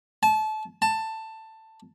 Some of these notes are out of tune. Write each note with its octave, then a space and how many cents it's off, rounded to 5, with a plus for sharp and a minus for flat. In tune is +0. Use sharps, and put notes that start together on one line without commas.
A5 -25
A5 +15